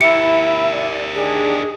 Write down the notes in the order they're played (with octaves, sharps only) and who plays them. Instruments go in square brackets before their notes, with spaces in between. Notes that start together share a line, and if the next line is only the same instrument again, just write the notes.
[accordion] E4 [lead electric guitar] G4 A#4 [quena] E5 [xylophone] C#7
[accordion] D5
[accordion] D#3 D4 [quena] G#4